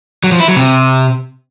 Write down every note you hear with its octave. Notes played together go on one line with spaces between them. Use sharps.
F#3
F3
E4
F#3
C3